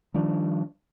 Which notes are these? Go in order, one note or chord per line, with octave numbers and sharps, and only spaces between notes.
D#3 F3 G3 D4